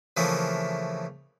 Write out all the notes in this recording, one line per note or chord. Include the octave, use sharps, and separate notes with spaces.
C#3 E3 F3 A3 A#3